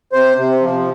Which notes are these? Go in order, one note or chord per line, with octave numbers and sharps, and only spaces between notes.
C3 C5
C3
F3